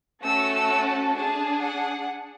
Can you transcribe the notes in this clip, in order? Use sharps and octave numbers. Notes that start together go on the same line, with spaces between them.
A3 C#4 F#4 A4 E6
E6
A5
D4 G#4 A5
F#5